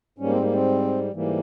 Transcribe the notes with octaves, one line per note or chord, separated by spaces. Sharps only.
G#2 G3 A#3 C#4
C4
A#3
C4
G#2 E3 G3 A#3